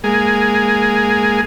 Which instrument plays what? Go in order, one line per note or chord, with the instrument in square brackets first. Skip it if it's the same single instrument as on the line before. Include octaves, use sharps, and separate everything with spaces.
[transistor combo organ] G#3 A#3 G#4